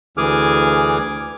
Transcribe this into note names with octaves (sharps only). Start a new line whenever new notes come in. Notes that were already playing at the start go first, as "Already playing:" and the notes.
D2 E3 G#4 G#5 D6 F6